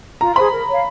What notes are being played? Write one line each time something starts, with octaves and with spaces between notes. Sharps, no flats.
F4 A#5
G#4 C5 B5
A#4
C#5 F5